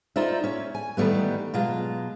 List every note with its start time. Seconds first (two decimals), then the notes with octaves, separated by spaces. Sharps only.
0.16 D#4 F4 C5 D5 E5
0.44 C#4 C#5
0.75 G#5
0.97 D#3 E3 G3 A3 B3
1.54 B2 F#3 G#3 F4